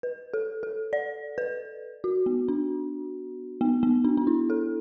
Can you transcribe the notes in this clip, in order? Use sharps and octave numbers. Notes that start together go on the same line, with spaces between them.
B4
A4
A4
D5
B4
F#4
B3
D4
B3
B3
D4
D4
E4
A4